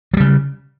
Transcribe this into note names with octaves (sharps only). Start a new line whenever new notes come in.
C#3 F#3 G3